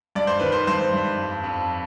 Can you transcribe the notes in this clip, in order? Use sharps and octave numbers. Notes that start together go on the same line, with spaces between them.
G2 D5
C5
D#3 B4
C5
G2 C5
G2
F2
F2